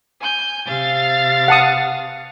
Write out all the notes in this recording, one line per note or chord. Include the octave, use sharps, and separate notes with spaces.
G#5 G6
C3 F5 A6
F#5 A5 D#6